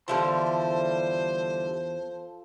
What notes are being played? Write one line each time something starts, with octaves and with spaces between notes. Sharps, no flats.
E2 D3 F3 G3 E4 A4 C5 C6